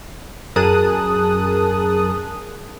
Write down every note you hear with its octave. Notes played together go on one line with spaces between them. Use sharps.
F#2 G#4 A#4 A5 D#6 F#6